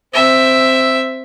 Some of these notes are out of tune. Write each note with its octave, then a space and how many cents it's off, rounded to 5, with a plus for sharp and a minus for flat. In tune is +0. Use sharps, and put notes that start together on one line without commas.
C4 +0 E5 +0